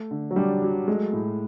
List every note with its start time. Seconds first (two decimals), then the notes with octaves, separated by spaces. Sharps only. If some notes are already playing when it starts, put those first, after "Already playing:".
Already playing: A3
0.11 D3
0.31 F#3
0.36 G3 D4
0.62 F#3
0.87 G#3 A3
1.13 A2